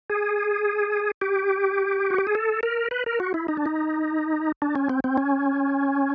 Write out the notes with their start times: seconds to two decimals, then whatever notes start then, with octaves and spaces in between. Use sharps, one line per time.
0.10 G#4
1.21 G4
2.10 F#4
2.18 G4
2.27 G#4
2.35 A4
2.63 A#4
2.91 B4
3.06 A#4
3.20 F#4
3.34 E4
3.48 D#4
3.57 D4
3.66 D#4
4.62 D4
4.75 C#4
4.89 C4
5.04 C4
5.18 C#4